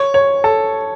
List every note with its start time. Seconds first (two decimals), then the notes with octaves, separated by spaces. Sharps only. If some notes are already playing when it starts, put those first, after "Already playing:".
Already playing: C#5
0.14 C#5
0.44 A4